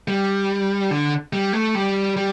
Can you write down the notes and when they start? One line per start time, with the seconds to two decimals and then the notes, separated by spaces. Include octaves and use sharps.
0.08 G3
0.91 D3
1.33 G3
1.53 A3
1.75 G3
2.16 G3